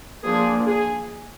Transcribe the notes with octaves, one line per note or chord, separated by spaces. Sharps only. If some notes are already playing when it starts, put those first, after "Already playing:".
F3 A#3 D4 G#4
G#4